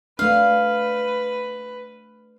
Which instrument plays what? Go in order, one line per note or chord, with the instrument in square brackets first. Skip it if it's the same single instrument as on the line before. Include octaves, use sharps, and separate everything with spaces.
[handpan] A3 D4 [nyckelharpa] B4 [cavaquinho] F5